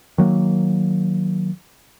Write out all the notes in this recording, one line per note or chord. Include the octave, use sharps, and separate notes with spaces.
D#3 F#3 A#3